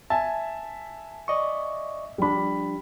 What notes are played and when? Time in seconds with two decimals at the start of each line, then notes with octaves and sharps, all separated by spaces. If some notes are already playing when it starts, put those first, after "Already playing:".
0.10 E5 G#5 A5
1.28 D5 D#5 C#6
2.18 F3 G3 D4 B5